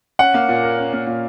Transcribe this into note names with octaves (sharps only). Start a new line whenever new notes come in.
C#4 F#5
A#3
A#2
A#4
C#4
A#3
A#2